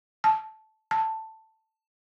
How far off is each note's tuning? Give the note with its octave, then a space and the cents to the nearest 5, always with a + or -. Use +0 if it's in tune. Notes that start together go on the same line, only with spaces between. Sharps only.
A5 -10
A5 +10